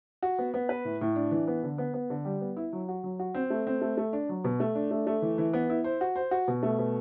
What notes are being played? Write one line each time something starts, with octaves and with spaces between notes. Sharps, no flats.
F#4
B3
B3
B4
A2
A2
D4
E3
B3
D3
B3
B3
D3
G3
B3
E4
F#3
F#4
F#3
F#4
C4
A3
C4
A3
A3
D4
F#3
B2
A3
D4
A3
A3
E3
E3
B3
E4
C5
F#4
C5
F#4
B2
A3
B2